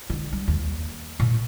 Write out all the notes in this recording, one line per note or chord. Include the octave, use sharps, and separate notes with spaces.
D3
G3
D#2
A#2